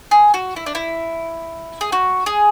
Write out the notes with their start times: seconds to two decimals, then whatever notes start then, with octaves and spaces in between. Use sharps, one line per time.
0.11 G#4
0.34 F#4
0.56 E4
0.66 D4
0.75 E4
1.81 G#4
1.92 F#4
2.26 G#4